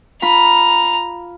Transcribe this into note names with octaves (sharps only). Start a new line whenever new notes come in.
F4 A#5 B5